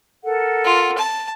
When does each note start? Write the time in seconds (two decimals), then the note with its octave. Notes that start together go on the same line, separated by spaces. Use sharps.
0.24 A4 A#4 F#5
0.65 F4
0.98 A5